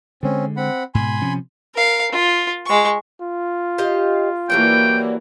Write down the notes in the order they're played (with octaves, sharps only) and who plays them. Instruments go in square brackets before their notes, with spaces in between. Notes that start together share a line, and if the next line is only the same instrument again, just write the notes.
[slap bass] D3 G#3 [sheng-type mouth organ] C4 C#4
[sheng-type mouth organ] C4 F#5 B5
[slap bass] G#2 B2 [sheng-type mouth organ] G#5 B5 C6
[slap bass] C3 F3 C#4
[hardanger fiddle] A#4 F5
F4
G#3 C#6
[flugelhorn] F4
[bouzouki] G4 D#5 F5
[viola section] E3 A#3 F#4 [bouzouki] F#3 G3 D4 [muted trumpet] G5